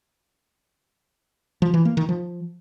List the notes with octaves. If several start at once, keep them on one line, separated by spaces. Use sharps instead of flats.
F3
E3
A#3
D#3
F3